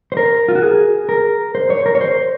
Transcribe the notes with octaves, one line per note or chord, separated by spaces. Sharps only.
C5
A#4
F4
F#4
G#4
A#4
C5
C#5
A#4
C#5
C5